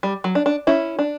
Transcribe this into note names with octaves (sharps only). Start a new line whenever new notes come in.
G3
F#3
D4
D4
C#4 E4
D4